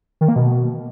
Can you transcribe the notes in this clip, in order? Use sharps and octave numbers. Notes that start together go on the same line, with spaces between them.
D#3
A#3
B2